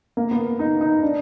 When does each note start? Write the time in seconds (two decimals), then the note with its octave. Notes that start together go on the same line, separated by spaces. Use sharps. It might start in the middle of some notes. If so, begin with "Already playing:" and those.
0.17 A#3
0.31 B3
0.59 D#4
0.81 D#4
1.02 D4